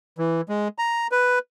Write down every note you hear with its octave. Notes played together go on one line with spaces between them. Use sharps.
E3
G#3
A#5
B4